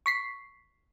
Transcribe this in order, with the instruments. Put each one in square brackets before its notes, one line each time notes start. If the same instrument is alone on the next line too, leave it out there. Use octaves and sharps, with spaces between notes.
[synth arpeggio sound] C#6 B6 C7